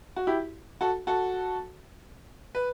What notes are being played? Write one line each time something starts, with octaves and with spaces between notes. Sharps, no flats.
F#4
E4 G4
F#4 A4
F#4 A4
B4